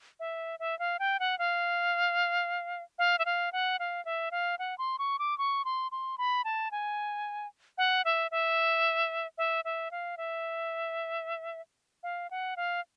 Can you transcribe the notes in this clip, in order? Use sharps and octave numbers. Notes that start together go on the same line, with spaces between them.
E5
E5
F5
G5
F#5
F5
F5
E5
F5
F#5
F5
E5
F5
F#5
C6
C#6
D6
C#6
C6
C6
B5
A5
G#5
F#5
E5
E5
E5
E5
F5
E5
F5
F#5
F5